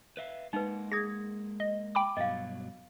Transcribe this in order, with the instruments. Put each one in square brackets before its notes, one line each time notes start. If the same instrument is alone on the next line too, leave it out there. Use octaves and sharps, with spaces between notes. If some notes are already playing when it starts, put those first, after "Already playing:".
[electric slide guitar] B4 E5 F5
[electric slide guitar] G#3 A#3 F#5 [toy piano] D#4 B4
[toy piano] G#4 D#6 [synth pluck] G#6 A#6
[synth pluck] D#5
G5 B5 D6
[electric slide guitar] G2 B2 F#3 [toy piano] D#5 F5